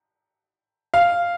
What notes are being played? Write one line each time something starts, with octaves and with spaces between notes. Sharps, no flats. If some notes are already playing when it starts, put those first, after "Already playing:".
F5